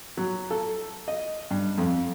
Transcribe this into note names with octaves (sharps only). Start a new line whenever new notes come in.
F#3
A4
D#5
G2
F2